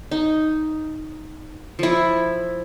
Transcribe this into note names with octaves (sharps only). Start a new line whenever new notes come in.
D#4
F3 E4